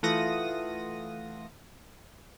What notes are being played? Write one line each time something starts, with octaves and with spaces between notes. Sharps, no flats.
E3 A3 F4 F#5 D#6 A#6